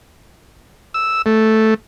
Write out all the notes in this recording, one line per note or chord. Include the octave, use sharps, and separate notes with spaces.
E6
A3